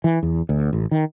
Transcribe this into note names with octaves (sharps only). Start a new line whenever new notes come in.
E3
E2
D2
A1
D#3